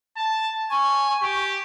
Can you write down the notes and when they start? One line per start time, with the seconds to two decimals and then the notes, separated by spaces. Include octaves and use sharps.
0.17 A5
0.71 G#5 C#6
1.22 G4